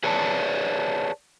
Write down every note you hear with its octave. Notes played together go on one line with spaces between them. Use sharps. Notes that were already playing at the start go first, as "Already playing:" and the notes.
G#4 B4 C#5 D5 F#5 A5